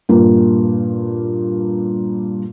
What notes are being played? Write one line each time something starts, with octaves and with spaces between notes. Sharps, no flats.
G2 A#2 A#3